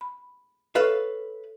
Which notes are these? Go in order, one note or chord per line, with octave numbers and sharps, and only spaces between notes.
B5
A4 B4 C#5 E5 F5 C#6